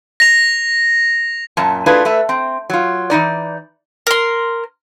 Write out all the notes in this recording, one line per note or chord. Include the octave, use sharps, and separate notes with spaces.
A#6 F7
F#2 A#2 A5
A3 D4 E4 F4 G#4 B4
A3 B4 E5
C4
F#3 F4
E3 G3 D#4 D5
A#4 C6